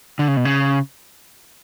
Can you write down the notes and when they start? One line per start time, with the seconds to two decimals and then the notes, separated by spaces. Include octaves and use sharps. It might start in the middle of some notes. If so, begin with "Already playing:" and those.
0.19 D3
0.28 C#3
0.37 B2
0.45 C#3